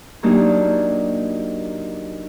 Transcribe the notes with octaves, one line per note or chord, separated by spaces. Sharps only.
F#3 A#3 D4 D#4 G4